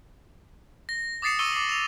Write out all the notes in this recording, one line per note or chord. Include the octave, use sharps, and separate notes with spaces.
A#6
D6 D#6 A6 C7 C#7 E7
C#6 E6 C#7 D#7 G7
D6 F#7
E7 F7